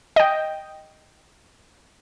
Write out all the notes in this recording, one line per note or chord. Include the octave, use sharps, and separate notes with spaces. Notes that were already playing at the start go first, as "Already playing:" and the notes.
D#5 G5